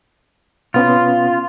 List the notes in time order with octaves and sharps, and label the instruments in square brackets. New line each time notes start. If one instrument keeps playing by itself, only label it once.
[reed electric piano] B2 B3 C#4 [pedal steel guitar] F4